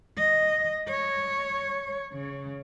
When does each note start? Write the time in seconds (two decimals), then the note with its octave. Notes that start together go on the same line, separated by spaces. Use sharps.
0.18 D#5
0.87 C#5
2.13 C#3